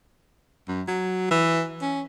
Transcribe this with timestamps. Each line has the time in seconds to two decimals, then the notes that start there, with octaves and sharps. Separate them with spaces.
0.68 F#2
0.88 F#3
1.31 E3
1.82 C#4